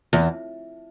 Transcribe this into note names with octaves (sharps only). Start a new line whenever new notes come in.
E2